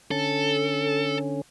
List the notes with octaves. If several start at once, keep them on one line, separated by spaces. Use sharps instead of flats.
D3 C#4 A4